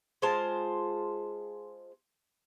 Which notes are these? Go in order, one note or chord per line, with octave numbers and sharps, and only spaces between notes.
G#3 F4 C5 A5